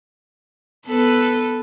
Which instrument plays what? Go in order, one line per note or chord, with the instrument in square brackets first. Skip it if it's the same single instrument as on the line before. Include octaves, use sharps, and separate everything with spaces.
[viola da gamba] B3 A4 B4